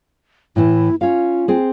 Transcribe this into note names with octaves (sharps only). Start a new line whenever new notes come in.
A2 E3 E4
C#4 F4 F5
C4 G#4